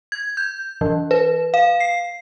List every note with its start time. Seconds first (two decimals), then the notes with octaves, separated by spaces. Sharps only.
0.12 G#6
0.37 G6
0.81 E3
1.11 B4
1.54 F5
1.80 C7